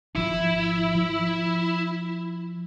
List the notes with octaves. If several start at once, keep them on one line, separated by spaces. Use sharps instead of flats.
G#1 F3 E4
F3